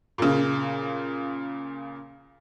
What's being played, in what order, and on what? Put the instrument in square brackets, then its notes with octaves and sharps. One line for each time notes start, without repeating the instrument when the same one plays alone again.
[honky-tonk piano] A#2 C#3